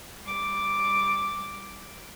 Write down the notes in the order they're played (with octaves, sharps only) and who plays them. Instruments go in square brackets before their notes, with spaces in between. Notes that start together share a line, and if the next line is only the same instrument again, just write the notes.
[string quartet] G3 D6